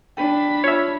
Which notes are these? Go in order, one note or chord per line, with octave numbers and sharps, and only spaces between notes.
D4 G5 B5
F4 C#5 E5